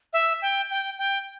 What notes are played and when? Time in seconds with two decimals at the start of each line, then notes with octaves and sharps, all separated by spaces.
0.13 E5
0.42 G5
0.70 G5
0.98 G5